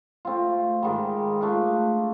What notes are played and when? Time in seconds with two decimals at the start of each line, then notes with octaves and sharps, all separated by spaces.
0.25 A3 C4 F4
0.83 G#2 D#3 G3
1.41 A3 D4 F4